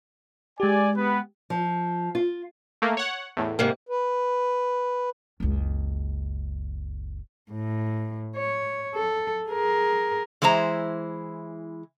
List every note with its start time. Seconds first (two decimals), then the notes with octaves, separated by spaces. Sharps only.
0.60 G#3 G4 D5 G#5
0.97 B3 B4
1.50 F3
2.15 F4
2.82 A3 A#3
2.97 C#5 F#5
3.37 E2 A2
3.59 G#2 C3 A#3
3.89 B4
5.40 F#1 C#2
7.51 A2
8.37 C#5
8.95 A4
9.49 G#4 A#4
10.42 E3 G#3 E4 C5 A#5